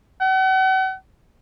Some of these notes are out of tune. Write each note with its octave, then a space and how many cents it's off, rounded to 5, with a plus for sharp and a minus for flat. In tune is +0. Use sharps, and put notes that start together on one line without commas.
F#5 +40